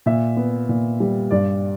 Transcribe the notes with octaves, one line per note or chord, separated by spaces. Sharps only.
A#2 E5
B3
A#2
G3
G2 D5